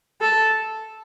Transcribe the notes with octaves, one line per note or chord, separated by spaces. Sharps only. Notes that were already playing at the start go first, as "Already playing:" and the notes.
A4